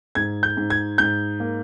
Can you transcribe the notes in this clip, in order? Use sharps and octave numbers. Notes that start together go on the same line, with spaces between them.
G#2 G#6
G6
G#2
G#6
G#2 G6
A#3